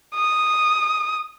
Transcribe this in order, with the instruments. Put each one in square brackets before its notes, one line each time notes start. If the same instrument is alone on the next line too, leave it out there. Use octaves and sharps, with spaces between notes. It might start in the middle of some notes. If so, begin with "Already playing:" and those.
[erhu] D#6